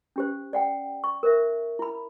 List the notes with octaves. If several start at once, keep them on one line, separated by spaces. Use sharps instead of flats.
C#4 G4 C5
D5 F#5 G5
C#6
A#4 C5 E5
E4 B5